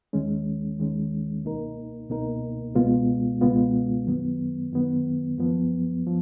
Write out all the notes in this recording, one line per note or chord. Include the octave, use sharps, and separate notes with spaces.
D#2 D#3 G#3 C#4
D#2 D#3 G#3 C#4
C#2 B2 A#3 D#4 A#4
C#2 B2 A#3 D#4 A#4
C#2 B2 G#3 B3 F4
C#2 B2 G#3 B3 F4
F#2 D#3 F#3 B3
F#2 D#3 F#3 B3
F#2 F3 B3
F3